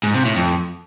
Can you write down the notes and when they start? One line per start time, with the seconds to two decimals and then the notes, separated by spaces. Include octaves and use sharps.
0.03 G#2
0.14 C3
0.25 A2
0.36 F2